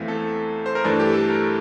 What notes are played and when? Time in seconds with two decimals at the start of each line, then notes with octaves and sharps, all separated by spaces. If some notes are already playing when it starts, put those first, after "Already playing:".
Already playing: E2 E3 A3 C4 E5 F5
0.08 A4
0.66 C5
0.75 A#4
0.84 G2 E3 A3 D4 A4
1.00 G4
1.14 A4
1.30 A#4